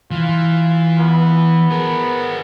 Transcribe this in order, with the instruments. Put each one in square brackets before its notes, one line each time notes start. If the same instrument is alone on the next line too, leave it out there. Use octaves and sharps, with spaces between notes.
[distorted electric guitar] E3 [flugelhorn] F4
[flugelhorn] B3
[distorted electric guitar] G#4 A#4